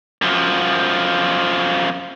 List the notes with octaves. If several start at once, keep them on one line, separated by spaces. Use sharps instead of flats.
F#2 F3